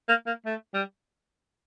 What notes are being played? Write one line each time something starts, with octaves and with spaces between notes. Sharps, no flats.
A#3
A#3
A3
G3